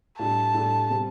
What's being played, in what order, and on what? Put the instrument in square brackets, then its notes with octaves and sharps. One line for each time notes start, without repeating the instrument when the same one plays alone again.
[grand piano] A2 G3 D4 A4 [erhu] A5
[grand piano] A2 G3 D4 A4
C3 G3 C4